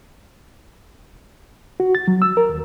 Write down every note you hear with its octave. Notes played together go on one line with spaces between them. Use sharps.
F#4
A6
F#3
E6
A#4
D#2